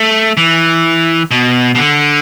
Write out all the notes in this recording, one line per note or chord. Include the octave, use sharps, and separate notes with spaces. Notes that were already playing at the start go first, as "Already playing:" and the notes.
Already playing: A3
E3
B2
B2
D3